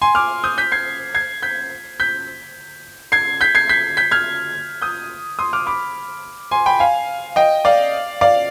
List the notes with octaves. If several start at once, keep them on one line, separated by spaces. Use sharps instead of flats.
G#5 C6
D6 F6
D#6 G6
G6 B6
G#6 C7
G#6 C7
G6 B6
G6 B6
G#6 C7
G6 B6
G#6 C7
G6 B6
G6 B6
F6 G#6
D#6 G6
C6 D#6
D6 F6
B5 D6
G#5 C6
G5 B5
F5 G#5
D#5 G5
D5 F5
D5 F5